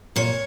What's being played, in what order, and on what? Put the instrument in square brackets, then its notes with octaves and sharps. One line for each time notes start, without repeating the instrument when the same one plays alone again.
[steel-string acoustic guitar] A#2 C#5